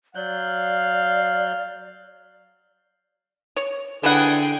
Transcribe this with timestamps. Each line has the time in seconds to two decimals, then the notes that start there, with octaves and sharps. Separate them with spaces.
0.15 F#3 D5 F5 F#6 G6
3.56 C#5
4.03 D3 E3 G3 G#4 F#5 G5